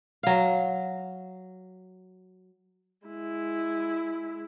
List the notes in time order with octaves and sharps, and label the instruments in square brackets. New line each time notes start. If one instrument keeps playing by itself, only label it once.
[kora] F#3 F5
[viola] G#3 E4